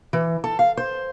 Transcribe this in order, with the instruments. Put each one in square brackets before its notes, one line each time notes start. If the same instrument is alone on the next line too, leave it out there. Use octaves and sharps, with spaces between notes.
[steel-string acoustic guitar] E3
A4
F5
C5